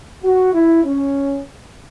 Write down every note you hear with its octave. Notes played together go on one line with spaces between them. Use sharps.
F#4
E4
C#4